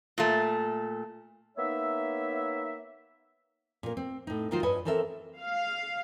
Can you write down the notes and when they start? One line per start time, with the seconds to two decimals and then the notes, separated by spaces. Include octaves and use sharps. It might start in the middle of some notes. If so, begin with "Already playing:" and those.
0.18 A#2 A3
1.57 A#3 B3 D#4 C#5 E5
3.83 A#2 A#3
3.97 C4
4.27 A2 D#4
4.51 D#3 F#3 D#4 F4 A#4 C5
4.63 G2 B4 C#5 D#5 G#5
4.85 E3 C4 A4 A#4 C#5 E5
5.40 F5